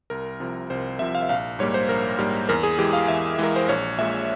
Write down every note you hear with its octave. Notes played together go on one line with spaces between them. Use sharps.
C2 A#4
C3 F3
C2 C5
C3 F3 E5
F5
E5
A#1 F5
G#2 G3 A#3 C#5
C5
A#1 A#4
G#2 G3 A#3
E2 A#4
G#4
E3 G#3 G4
F5
E2 E5
E3 G#3 A#4
C5
A#1 C#5
A#2 G#3 E5